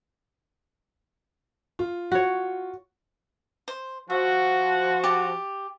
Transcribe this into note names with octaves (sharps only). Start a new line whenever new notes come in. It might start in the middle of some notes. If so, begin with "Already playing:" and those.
F4
F#4 C#5
C5
F3 F#4 E5
G4 A5